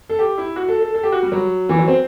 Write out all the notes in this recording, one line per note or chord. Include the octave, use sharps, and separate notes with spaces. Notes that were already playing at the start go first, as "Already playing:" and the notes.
A4
G4
E4
F#4
A4
A4
A4
G4
F#4
G3
F#3
E3
F#3
C4